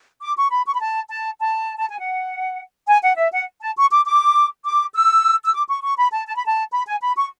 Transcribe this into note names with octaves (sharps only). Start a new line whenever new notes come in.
D6
C#6
B5
C#6
B5
A5
A5
A5
A5
G#5
F#5
G#5
F#5
E5
F#5
A5
C#6
D6
D6
D6
E6
E6
D6
C#6
C#6
B5
A5
A5
B5
A5
B5
G#5
B5
C#6